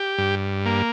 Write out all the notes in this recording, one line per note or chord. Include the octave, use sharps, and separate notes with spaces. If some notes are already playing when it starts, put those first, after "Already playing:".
Already playing: G4
G2
A#3